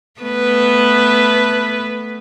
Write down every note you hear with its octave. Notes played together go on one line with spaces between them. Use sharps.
A3 B3 B4